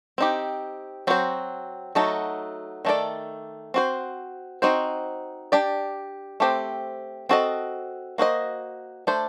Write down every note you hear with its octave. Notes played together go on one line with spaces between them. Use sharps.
C4 D#4 G4
F#3 C4 F#4 C5
F#3 A3 D#4 F#4 A4
D#3 A3 D4 A4 D5
C4 F#4 C5
C4 D#4 F#4 C5
D4 G4 D5
A3 C4 G4 C5
C4 F#4 A4 D#5
A#3 F#4 A4 C5 D#5
A3 D4 A4 C5